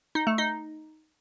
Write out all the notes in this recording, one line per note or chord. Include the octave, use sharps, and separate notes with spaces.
D#4
A3
D#4